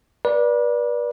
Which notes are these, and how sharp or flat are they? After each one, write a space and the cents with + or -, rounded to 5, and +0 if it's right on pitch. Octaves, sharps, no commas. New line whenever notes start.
B4 -35 D5 +0